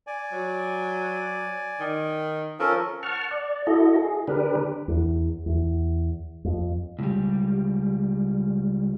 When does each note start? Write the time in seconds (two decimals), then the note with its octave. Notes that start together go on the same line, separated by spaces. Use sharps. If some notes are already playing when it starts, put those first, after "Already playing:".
0.07 D5 G#5
0.33 F#3
1.80 D#3
2.60 F3 C#4 A4 A#4
3.03 F#5 A5 C#6 F6
3.31 D5
3.67 E4 F#4 A4 D#5
4.02 G#4
4.28 D3 D4 G4 A#4 B4
4.88 E2
5.46 E2
6.45 F2
6.99 C#2 G3